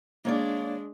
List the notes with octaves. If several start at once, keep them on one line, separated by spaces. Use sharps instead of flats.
G#3 A#3 D4 C#5 D5